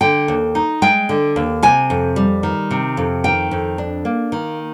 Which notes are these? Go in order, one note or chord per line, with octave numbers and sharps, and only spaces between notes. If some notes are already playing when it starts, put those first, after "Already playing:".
D3 G5
D#2
D#4
G#3 G5
D3
D#2
C3 G#5
F2
G3
D#3
C3
F2
D#3 G5
F2
D4
A#3
D#3